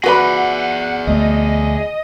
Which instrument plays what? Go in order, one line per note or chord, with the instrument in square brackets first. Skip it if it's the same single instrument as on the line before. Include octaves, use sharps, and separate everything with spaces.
[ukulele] F#4 B4 B5 [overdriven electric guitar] G#4 D5 [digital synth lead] F#5
[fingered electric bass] D2 A3 [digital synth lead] D#5